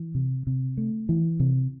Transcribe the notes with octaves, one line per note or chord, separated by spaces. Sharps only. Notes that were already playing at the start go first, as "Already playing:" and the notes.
Already playing: E3
C3
C3
A3
E3
C3